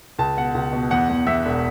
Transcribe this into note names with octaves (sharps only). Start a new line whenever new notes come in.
C#2 A5
B2 F#5
C#2
B2
E2 F#5
E2
E2 E5
E1